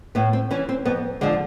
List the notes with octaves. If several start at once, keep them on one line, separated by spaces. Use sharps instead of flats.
A2 B3
C4
E3 C#4
C4
F2 B3
D3 F3 G#3